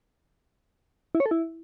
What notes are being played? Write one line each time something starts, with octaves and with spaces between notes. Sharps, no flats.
E4
C#5
A4
E4